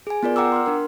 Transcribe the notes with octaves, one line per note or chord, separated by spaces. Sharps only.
G#4 G#5
B3 F4 A#4 D5
F#5 G5 A#5 D6 E6
C6 F6
D4 A#4